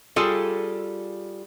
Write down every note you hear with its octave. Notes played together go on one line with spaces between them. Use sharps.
G3 F4 G#4 A4